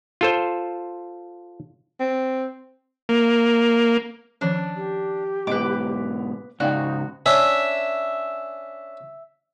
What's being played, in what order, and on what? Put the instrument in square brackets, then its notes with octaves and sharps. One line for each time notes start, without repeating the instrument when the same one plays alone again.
[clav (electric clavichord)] F4 A4 C5
[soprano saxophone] C4
[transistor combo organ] A#3
[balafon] D#3 F3 C#4 [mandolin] D4
[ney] G4
[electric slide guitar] G#2 B2 [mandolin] B4 D6 [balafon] D#5
[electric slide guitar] G#2 C#3 [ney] D#4 [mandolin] F#4 [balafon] D5 F5 G5
[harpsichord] C#4 D4 [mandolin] E5